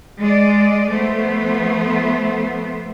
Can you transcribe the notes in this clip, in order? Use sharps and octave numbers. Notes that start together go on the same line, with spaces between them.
G#3 D5
F3 A3 B3 C5